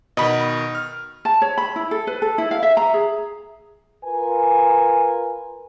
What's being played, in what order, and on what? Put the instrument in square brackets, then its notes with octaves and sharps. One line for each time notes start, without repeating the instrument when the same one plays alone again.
[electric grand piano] B2 D#3 [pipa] D#5 B5
[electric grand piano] F6
[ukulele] A5
C#5
B5
E4
A4
B4
A4
E4
F5
E5
A#5
G#4
[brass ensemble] F4 A#4 B4 G#5